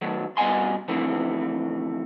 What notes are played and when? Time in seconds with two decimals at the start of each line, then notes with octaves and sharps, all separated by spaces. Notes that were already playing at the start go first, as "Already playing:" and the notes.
0.01 D#3 F#3 A3
0.37 G2 B2 D#5 F#5 G#5 C6
0.88 D3 E3 F3 A3 C4